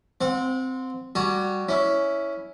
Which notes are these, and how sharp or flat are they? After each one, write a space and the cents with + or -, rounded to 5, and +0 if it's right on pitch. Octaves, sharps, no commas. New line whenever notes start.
C4 -10 F#5 -35
G3 +0 F#4 +0 G#5 +25
C#4 +10 E4 -5